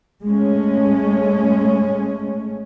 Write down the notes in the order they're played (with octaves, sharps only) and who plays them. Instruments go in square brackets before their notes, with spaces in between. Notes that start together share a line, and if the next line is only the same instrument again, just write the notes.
[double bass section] G#3 A3 C#4